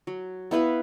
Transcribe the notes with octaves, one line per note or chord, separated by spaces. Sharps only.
F#3
B3 E4 B4 F5